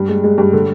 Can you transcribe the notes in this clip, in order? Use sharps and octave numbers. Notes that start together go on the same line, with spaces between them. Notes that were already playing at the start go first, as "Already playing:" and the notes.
Already playing: G2
G#3
G#3
G2
D3